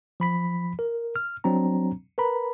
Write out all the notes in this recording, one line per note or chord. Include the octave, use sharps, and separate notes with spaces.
F3 B5 B6
A#4
F6
F#3 C4 D4 A#5
A#4 B4 A#5 B5